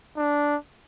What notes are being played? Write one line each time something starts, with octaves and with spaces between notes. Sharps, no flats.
D4